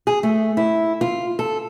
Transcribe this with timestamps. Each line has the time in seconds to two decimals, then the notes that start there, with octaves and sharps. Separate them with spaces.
0.07 G#4
0.23 A3
0.57 E4
1.01 F4
1.39 A4